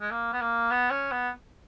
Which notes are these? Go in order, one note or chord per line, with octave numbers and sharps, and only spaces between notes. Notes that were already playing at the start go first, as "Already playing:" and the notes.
G#3
A#3
B3
A#3
B3
C#4
B3